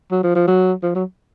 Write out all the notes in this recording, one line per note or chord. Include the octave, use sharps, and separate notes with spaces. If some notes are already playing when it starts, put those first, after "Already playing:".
F#3
F3
F3
F#3
F3
F#3